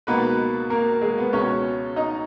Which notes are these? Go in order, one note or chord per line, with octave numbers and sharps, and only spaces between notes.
C#2 B2 A#3 B3 D#4 B4
A#3 A#4
G#3 G#4
B3 B4
C#2 B2 G#3 B3 C#4 C#5
D#4 D#5